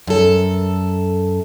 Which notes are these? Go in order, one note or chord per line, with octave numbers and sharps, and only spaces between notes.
F#2 A4